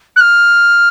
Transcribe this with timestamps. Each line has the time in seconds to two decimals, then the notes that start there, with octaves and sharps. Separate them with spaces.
0.16 F#6
0.20 F6